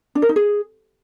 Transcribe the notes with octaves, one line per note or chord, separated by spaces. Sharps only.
D4
A#4
D#4
G#4